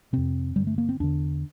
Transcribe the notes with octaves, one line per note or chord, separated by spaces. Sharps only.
F2 C3 C4
G2 D3 G3
A3
A#3
C4
E2 D3 D4